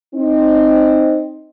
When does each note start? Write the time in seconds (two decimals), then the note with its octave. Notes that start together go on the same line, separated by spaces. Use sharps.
0.15 C4 D#4